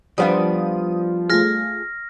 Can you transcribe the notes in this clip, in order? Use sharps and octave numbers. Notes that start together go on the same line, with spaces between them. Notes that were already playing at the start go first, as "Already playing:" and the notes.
F3 G3 B3 D4 D#6
A3 F4 G#4 F6 A#6